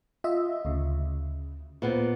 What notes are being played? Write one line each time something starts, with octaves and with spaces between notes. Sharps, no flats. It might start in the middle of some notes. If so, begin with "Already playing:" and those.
F4 D#5 E5
D2 C#3
A#2 B3 C4